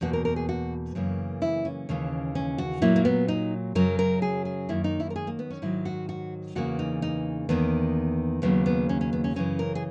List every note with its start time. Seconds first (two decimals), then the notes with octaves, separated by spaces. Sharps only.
0.01 E2 B2 A#3 F#4
0.13 A#4
0.25 A#4
0.36 G#4
0.49 F#4
0.95 F#2 C#3 E3 A#3
1.42 E4
1.65 C#4
1.89 D#2 C#3 E3 A#3
2.35 C#4
2.58 F#4
2.82 A#2 F#3 A#3 E4
2.96 A#3
3.05 B3
3.28 D#4
3.75 F#2 C#3 F#3 A#4
3.99 A#4
4.22 G#4
4.45 G#4
4.69 F#2 D#3 A#3 E4
4.84 D#4
5.00 E4
5.10 A#4
5.16 G#4
5.27 A#3
5.39 B3
5.50 C#4
5.62 G#2 D#3 F#3 E4
5.85 F#4
6.09 F#4
6.55 E2 C#3 E3 A#3 F#4
6.79 D#4
7.02 D#4
7.49 E2 D#3 A#3 B3
8.42 D#2 C#3 F#3 A#3 B3
8.66 B3
8.89 C#4
9.01 C#4
9.13 B3
9.24 C#4
9.36 F#2 C#3 E3 C#4
9.59 A#4
9.75 G#4